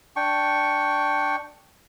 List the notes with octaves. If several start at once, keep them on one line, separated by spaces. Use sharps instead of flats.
D4 G5 C#6